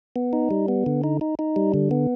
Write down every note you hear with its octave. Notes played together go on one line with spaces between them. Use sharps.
B3
D#4
G3
B3
D3
D#4
D#4
D#4
G3
D3
B3